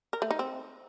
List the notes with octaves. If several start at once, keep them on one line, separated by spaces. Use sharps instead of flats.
A#4
A3
D#4
C4